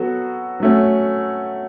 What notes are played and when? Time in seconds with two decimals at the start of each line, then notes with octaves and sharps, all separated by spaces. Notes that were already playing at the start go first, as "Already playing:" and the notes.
Already playing: F#3 B3 F#4 A4
0.60 F#3 A3 C#4